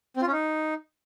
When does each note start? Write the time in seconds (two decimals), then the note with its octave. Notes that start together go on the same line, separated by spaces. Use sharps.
0.17 C4
0.22 F4
0.27 C#4
0.32 D#4